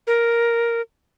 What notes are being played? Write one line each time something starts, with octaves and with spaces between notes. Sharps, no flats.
A#4